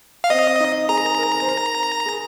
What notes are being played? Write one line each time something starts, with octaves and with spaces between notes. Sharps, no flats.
F5
C4 D#5
D#4
G#4 A#5
A#4
A#4
A#4
C5
A#4
G#4